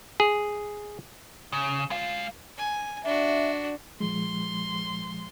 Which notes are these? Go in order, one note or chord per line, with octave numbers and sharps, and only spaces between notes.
G#4
C#3
G#3 F5
G#5
D4 F#4 E5
A#2 F3 G#3 C6